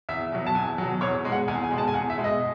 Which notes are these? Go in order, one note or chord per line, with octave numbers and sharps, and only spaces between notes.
E2 E5
B2 F#3
A5
E2 G#5
B2 F#3
E2 C#5
B2 G#3
F#5
E2 G#5
G#5
B2 G#3
A5
G#5
E2 F#5
E5
B2 G#3
D#5